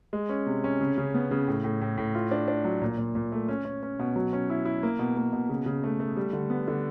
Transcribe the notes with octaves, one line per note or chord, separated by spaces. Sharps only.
G#3
C#4
C3
C#4
C#3
C#3
B3
C#3
A2
A2
A2
A2
F4
D4
D4
F#3
A#2
A#2
A#2
A3
C#4
C#4
C#4
B2
F#3
C#4
E4
E4
A#3
B2
A#3
B2
C#3
C#3
A3
A3
G3
D3
B3
D3